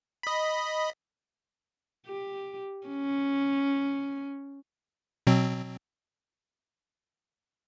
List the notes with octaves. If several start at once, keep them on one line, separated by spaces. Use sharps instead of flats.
D#5 B5
G4
C#4
B2 F#3 C4